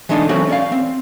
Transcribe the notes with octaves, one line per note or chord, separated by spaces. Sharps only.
E3 G#3 A3 D4 D#4 D#5
E3 F#3 A3 C4 C#4 F#4
C#4 D5 F5
C4